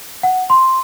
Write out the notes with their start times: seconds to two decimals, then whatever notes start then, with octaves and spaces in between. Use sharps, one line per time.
0.23 F#5
0.50 C6